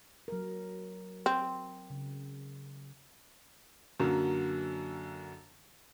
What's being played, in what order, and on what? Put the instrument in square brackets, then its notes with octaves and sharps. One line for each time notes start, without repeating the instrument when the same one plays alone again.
[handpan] F#3 A#4
[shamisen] C4
[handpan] C#3
[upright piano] F#2 D3 F#3 A#3